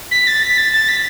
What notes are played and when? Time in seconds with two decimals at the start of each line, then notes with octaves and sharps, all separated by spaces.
0.11 B6
0.27 A6
0.43 B6
0.58 A6
0.73 A6
0.89 B6